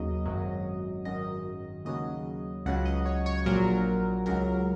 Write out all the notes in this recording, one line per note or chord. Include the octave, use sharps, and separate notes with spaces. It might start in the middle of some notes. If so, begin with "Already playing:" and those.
Already playing: D#2 C#3 F#3 D#5
G#1 F#2 F#3
G#1 F#2 D#3 D#5
D#2 C#3 F#3 D#5
C#2 C#3 F#3 F#5
D#5
C#5
C#5
A#1 A#2 F#3 A#4
C#2 C#3 F#3 A#4